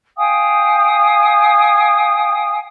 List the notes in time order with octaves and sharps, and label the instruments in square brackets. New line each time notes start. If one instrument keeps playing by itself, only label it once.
[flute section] F5 G5 G#5 D#6